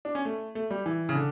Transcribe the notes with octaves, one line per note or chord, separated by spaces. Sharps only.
D4
C#4
A3
A3
G3
E3
C#3
D3